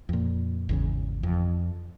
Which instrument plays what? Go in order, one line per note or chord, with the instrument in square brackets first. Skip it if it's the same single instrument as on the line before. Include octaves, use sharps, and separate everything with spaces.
[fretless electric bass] F2 A#2
G#1 E2 C#3
F2